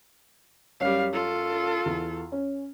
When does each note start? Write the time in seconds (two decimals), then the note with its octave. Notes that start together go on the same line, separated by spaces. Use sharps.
0.80 F#2 G3 C#5 F5
1.13 F4 A4
1.86 E2
2.32 C#4